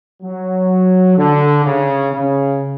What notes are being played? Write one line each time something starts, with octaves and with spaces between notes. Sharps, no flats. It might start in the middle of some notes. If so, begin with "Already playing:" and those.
F#3
D3
C#3
C#3